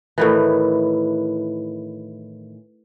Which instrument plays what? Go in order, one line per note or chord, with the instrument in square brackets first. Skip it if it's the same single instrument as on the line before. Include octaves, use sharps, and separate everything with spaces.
[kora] A2 D#3 E3